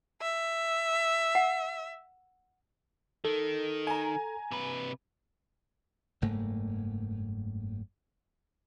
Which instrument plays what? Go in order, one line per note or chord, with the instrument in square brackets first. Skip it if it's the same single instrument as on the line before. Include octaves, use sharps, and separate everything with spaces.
[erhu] E5
[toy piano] F#5
[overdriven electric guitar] D#3 [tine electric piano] A4
[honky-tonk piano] G#5 A#5
[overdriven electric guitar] C3 B4
[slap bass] F#1 G#2 A3 A#3